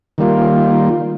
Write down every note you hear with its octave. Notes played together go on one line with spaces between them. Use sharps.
D#3 G3 A#3 F4